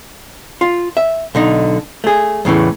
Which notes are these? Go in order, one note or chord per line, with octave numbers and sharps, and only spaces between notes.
F4
E5
B1 D3 D#4
A3 G#4
E2 A2 C#3 E3